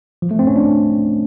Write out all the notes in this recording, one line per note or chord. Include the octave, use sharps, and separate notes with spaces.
F3
A3
C4
C#4
D4